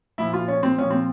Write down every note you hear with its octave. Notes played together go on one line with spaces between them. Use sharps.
A#2 F3 E4
F4
C#4
C4
A#2 F3 C#4
C4